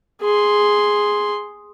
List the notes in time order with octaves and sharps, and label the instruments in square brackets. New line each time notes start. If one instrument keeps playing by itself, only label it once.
[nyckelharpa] G#4 C6